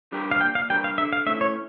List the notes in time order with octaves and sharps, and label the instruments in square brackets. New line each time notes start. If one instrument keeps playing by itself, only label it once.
[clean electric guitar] G3 D4 G4 A#4
[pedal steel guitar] F5
[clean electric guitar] A#2 [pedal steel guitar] G5
[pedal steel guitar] F5
[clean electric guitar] G3 D4 G4 A#4 [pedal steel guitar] G5
[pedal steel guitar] F5
[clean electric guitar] D3 [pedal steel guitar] E5
[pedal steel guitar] F5
[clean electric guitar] A3 C#4 E4 [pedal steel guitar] E5
[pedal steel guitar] C#5